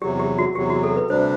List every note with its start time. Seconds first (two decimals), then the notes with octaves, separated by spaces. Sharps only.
0.02 E2 C3 F#3 G4
0.20 G4
0.38 F#4
0.55 E2 C3 F#3 G4
0.70 F#4
0.83 A4
0.96 B4
1.09 D2 C3 G3 D4 C5